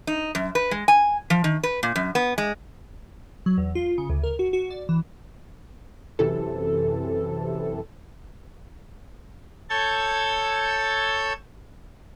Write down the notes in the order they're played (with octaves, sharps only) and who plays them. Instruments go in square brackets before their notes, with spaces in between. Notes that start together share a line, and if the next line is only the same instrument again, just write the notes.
[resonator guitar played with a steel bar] D#4
F#2
B4
G#3
G#5
F3
D#3
B4
A#2
F#2
B3
G#3
[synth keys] F#3
E2
F4
C#3
D2
A#4
F#4
F#4
D5
E3
[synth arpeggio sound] F#2 C3 E3 A4
[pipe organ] A4 C#5 A5 E6 G6 G#6